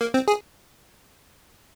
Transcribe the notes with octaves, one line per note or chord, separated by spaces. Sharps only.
A#3
C4
G#4